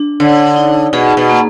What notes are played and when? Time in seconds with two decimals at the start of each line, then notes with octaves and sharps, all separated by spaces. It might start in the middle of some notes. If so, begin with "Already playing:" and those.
Already playing: D4
0.20 D3 C#5
0.56 D#4
0.93 B2 G#4
1.17 B2
1.30 A#3